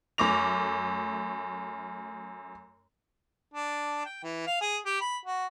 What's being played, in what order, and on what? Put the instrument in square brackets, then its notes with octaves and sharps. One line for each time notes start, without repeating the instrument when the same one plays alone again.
[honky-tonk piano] F#2 A3 D6 A#6 F7
[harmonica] D4
G5
E3
F5
G#4
G4
B5
F#4